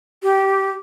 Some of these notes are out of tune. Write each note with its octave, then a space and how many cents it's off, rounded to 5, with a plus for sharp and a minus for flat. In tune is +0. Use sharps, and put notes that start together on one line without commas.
G4 -15